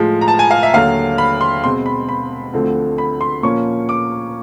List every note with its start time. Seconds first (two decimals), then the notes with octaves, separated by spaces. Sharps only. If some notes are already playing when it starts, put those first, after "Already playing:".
Already playing: A2 F3 G#3
0.21 A#5
0.28 A5
0.39 G#5
0.51 F5
0.63 E5
0.73 D#2 D3 F#3 F5
1.18 B5
1.41 C6
1.63 B2 G#3 C4 C6
1.86 B5
2.09 B5
2.53 D2 D3 F3 A3 C4
2.98 B5
3.21 C6
3.43 A#2 F3 A#3 C#4 C#6
3.89 D6